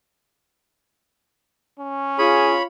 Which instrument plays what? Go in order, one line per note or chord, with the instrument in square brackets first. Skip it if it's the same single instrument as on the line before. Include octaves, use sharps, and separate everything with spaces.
[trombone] C#4
[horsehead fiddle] F4 [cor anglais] G#4 [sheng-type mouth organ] C#5 B5